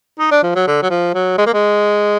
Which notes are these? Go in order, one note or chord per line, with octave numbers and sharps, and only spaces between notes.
D#4
D4
F3
F#3
D3
F#3
F3
F#3
G#3
A#3
G#3